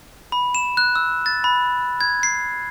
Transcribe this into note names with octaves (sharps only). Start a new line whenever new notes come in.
B5
E7
F#6
E6
A6
B5
G#6
C7